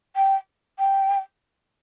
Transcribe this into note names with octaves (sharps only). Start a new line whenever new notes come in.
G5
G5